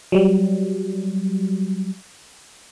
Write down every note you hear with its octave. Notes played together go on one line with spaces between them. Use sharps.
F#3 G3